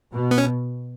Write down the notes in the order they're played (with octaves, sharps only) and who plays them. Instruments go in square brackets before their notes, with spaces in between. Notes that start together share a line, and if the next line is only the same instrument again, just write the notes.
[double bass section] B2
[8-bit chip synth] B3
C#4